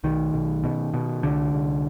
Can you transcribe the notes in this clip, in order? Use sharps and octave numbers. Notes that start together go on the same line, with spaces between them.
B1 D#3
B1
B2
B2
C2 D3
C2